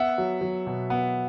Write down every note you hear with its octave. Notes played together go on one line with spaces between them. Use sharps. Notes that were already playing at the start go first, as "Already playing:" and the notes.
Already playing: B3 E5 F#5
F#3
F#3
B2
B3